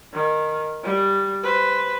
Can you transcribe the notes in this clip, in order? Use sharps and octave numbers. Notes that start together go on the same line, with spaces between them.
D#3
G3
B4 C5